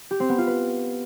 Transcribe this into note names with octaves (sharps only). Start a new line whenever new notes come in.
G4
C4
B3
F4
B4